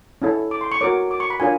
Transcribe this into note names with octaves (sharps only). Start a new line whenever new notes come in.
C#4 E4 A4 C#5
D6
C6
C#6
F#4 A#4 C#5 D6
D6
C#6
B5
D4 F4 A#4 C#5 G#5